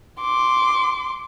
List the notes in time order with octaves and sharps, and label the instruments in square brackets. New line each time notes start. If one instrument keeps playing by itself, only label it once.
[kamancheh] C6 D6